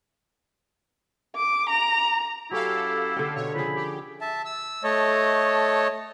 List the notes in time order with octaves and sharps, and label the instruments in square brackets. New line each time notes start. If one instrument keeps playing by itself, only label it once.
[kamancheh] D6
A#5
[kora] F#3 C#4 [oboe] E4 [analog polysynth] G4 A4 F5
[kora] D3 G5
[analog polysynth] B2 C#5
[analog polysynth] C#3 [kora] F3 G#4 [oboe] B5
[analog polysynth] G4
[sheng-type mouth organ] E5 A5
E6
A3 C#5 D#5 A5